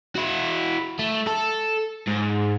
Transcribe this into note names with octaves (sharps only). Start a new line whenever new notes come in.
E4 F#4
A3
A4
G#2